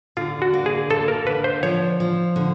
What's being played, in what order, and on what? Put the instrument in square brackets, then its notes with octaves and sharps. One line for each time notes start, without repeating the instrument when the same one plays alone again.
[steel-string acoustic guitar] D3 [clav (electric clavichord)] F4
[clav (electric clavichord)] F#4
[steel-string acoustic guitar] A#3
[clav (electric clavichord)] G#4
[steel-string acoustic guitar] A#3 [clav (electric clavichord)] A4
[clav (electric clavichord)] A#4
[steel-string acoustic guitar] D3 [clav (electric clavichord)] B4
[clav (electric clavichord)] C5
[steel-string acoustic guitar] F3 [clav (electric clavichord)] C#5
[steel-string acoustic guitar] F3
D3